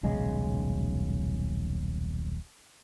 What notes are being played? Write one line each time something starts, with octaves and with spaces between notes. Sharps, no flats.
D#1 B1 C#3 G#3